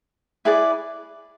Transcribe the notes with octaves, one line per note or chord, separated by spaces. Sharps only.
E4 G#4 B4 D5